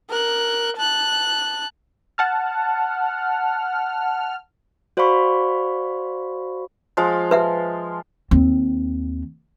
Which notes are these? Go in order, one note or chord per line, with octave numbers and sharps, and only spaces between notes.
A#4 F#6
A5 F#6
F#5 A5 F6
F#4 C5 D5 F5 B5 C#6
F3 G#3 F5
B4 E5 F#5
D#2 C4